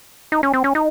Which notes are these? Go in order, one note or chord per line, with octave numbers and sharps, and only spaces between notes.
D#4
C#4
C4
C#4
D#4